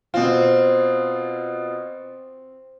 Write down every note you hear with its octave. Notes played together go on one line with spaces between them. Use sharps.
B2 C4 F4